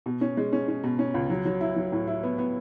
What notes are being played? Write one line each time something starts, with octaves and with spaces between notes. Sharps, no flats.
B2
C#4
G#3
C#4
C#4
B2
C#4
C#2
F#3
F#3
E4
F#3
A2
E4
B3
B3